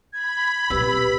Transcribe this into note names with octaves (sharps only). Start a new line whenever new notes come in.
B5 G#6
B2 C4 G4 B4 E6